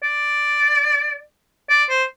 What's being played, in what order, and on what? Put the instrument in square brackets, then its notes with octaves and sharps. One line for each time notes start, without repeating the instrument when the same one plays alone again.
[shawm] D5
D5
C5